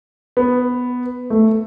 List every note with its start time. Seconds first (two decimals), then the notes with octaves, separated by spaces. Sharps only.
0.37 B3
1.30 A3